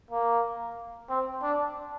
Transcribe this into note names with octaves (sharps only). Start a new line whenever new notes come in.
A#3
C4
D4